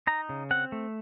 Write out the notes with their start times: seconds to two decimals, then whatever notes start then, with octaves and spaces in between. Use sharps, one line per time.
0.07 D#4 A#5
0.29 C#3
0.51 C4 F#5
0.72 A3